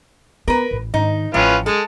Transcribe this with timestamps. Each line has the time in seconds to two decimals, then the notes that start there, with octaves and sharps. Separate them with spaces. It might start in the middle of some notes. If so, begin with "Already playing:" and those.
0.48 B3 A#4 B4
0.71 A1
0.94 G#2 D#3 D#4
1.34 A1 A2 F3 C#4 F4 B4
1.66 G#3 A4